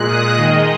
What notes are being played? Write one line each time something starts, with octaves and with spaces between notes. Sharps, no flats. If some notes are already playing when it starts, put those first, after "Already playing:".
Already playing: A#2 G#3 F#6
D#6
D#3 G#3 D#5